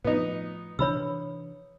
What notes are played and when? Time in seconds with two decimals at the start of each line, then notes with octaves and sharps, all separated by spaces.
0.05 A2 F3 B3 D#4
0.79 C3 E3 D4 C#5 B5 E6